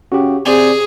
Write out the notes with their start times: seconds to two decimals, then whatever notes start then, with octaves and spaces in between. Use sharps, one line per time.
0.12 C#3 F#4 G4
0.46 C3 G#4 C5 D5 G#5